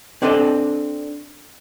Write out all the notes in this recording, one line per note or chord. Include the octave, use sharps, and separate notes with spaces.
C4 D4 A4 D5 D#5